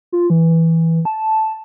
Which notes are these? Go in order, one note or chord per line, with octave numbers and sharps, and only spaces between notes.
F4
E3
E3
A5